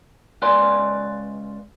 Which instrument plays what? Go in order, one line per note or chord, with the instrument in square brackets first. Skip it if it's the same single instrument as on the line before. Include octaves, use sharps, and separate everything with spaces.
[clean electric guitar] C#2 B4 D5 F5 G#5 C6